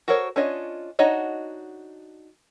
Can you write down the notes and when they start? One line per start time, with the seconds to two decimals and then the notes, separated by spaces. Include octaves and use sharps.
0.08 F#4 A4 A#4 C5 C#5
0.36 C#4 D4 F4 C#5 D#5
0.99 D4 D#4 F#4 C#5 D#5